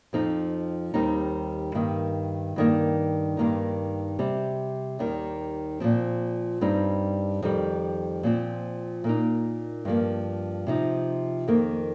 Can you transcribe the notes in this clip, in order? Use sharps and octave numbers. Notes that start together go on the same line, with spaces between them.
F2 F3 C4 D#4
D#2 D#3 G3 C4 D#4
G2 D#3 A#3 D#4
G2 D#3 A#3
G2 D#3 A#3 D#4
C3 G3 C4
D#2 D#3 G3
A#2 F3 C4
G2 G3 C4 D#4
F2 D#3 G3
A#2 F3 C4
A#2 A#3 D#4
G2 F3 A#3
C3 F3 D#4
F2 D#3 A#3